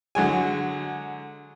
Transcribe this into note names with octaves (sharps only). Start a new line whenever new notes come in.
D3 F#3 G#3 G#5